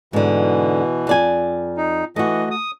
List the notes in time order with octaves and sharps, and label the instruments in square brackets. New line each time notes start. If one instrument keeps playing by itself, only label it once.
[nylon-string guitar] G#2 D3 [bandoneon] B2 E3
[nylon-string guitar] F2 D5 G#5
[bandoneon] D#4
[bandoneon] E3 D#5 [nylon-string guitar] A3 F#4
[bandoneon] D#6